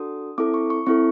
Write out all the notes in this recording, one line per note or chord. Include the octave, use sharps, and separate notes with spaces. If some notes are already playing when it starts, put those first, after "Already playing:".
Already playing: D4 F#4 A4 D#6
C4 E4 A4 D6
C#6
C#6
C4 E4 A4 C#6